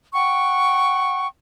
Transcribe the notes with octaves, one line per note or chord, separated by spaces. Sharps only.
F#5 G5 C#6